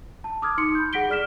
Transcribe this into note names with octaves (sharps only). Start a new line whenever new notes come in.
A5
D6 D#6 F6 G#6
D#4 C6 C#7
B5 G6
G#4 F#5 A#6 B6 D7 G7
G#4 D5 F6 B6 E7